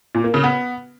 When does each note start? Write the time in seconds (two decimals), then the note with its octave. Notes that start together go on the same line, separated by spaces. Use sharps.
0.15 A#2
0.24 A#3
0.34 C#3
0.44 B3